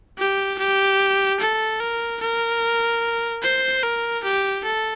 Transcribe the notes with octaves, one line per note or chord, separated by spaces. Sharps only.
G4
G4
A4
A#4
A#4
C5
A#4
G4
A4